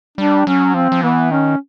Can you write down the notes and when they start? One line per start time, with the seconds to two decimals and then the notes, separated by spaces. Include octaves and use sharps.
0.18 G3 D4
0.47 F#3 C#4
0.74 F3 C4
0.92 F3
1.03 E3 B3
1.31 D#3 C#4